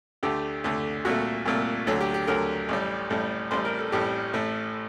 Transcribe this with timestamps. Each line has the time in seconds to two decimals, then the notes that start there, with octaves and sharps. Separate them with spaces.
0.23 D2 D3 A3 G4
0.64 D2 D3 A3
1.05 C2 A#2 A3 F#4
1.46 C2 A#2 A3
1.87 D2 D3 F#3 A4
2.01 G4
2.14 G4
2.27 D2 D3 F#3 A#4
2.69 A1 A2 G3
3.10 A1 A2 G3
3.51 A1 A2 G3 C5
3.65 A#4
3.79 A4
3.92 A1 A2 G3 G4
4.33 A1 A2 A3